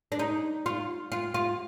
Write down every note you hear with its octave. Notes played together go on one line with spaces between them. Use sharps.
D4
D#4
F4
F4
F4